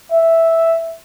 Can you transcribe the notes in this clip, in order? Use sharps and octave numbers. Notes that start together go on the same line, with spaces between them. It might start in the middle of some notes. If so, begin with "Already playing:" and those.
E5